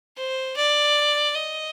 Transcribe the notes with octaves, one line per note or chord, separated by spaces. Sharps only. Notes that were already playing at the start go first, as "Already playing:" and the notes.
C5
D5
D#5